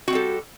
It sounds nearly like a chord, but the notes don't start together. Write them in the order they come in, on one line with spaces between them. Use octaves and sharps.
F#4 C4 G3 A4